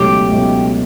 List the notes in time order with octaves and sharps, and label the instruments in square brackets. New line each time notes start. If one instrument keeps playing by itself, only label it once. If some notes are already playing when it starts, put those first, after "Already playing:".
Already playing: [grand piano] C#2 B2 F#3 A3 E4 [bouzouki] G4
[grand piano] C#2 B2 F#3 A3 E4